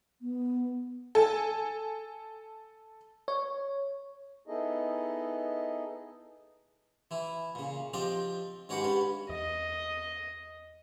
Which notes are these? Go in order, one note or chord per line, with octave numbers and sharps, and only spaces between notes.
B3
A4 G#5
C#5
B3 D#4 E4 G#4 A4 D#5
E3 E4
A#2 C#3
F3 C4 D4 G4 D#5
G#2 C#4 F#4 G4 B4 F#5
G2 G3 C#4 B4
E2 D#5